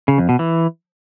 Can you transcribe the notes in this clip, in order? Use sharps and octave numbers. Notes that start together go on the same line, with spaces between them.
C#3
F2
B2
E3